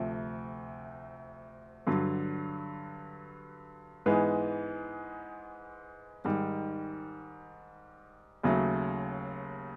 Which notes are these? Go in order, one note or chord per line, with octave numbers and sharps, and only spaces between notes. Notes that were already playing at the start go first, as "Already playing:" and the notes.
Already playing: D2 C3 F3 A3
G2 D3 F#3
G#2 E3 G#3 B3
G#2 D#3 G3
D#2 C#3 F#3 A3